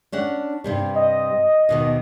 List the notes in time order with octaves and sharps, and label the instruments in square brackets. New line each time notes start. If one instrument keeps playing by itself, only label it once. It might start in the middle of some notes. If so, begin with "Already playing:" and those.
[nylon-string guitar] C#4 D4 F#5
G2 C3 G3
[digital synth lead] D#5
[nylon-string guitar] D#2 B2 D#3